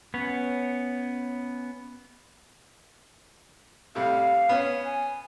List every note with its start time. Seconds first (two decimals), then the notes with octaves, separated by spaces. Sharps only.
0.14 B3 C#4 C#5
3.95 A2 C3 G3 F5
4.49 B3 C#4
4.85 G#5